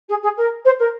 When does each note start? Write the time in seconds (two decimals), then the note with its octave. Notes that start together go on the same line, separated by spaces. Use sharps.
0.09 G#4
0.22 G#4
0.37 A#4
0.65 C5
0.79 A#4